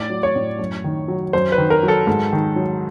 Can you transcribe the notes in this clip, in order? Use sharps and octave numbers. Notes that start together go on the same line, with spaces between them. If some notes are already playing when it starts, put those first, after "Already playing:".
Already playing: A2 D5
F#3
C#5
A2
F#2
D#3
F#3
F#2 C5
B4
D#3
A#4
F#3
A4
G#2
D#3
F#3